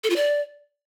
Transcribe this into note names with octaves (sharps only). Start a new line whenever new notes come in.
A4
F4
D5